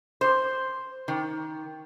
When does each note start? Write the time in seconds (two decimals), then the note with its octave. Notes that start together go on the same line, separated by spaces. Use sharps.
0.21 C5
1.08 D#3